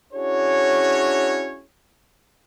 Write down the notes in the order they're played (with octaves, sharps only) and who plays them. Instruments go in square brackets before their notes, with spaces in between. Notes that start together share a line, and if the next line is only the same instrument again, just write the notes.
[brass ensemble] C#4 D4 E4 F#4 G#4 C#5